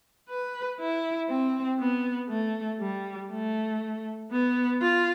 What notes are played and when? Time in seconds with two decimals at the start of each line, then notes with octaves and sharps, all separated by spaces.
0.29 B4
0.79 E4
1.29 C4
1.79 B3
2.29 A3
2.80 G3
3.31 A3
4.32 B3
4.82 F4